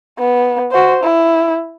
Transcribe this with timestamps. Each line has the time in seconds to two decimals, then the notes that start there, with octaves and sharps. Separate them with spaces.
0.19 B3
0.72 F#4 C5
1.03 E4